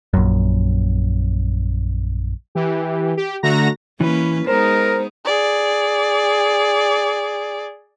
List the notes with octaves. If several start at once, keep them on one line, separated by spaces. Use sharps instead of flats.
A#1 F#2
E3 G4
G4
D3 A3 F#4 A#5 A#6
E3 A#3 C#4 B4
G#3 B3 D#4 A#4 C5 A#5
G#4 D5